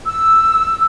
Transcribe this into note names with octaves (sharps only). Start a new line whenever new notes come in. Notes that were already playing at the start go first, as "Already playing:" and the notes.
E6